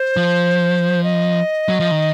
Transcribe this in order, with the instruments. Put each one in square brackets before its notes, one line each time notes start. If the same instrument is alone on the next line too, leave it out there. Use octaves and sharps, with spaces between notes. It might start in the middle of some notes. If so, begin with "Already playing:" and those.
Already playing: [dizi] C5
[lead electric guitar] F3
[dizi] D#5
[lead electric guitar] F#3
F3
D#3